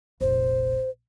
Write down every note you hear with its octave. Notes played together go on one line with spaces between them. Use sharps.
F1 A#1 C5